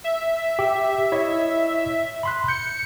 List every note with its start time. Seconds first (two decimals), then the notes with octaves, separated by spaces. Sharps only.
0.04 E5
0.59 G4
1.12 E4 C#5 D#5
2.23 B5 C6 F#6
2.48 G6 C#7